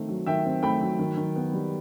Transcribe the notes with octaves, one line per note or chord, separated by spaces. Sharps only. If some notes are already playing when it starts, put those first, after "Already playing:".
Already playing: D#3 A3 C4 C5
F#3
D#3 E5 G5
C4
A3 G5 B5
F#3
D#3
D#3
B3
G3